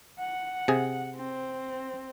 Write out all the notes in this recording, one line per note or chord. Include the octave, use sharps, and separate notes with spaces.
F#5
C3 G#4
C4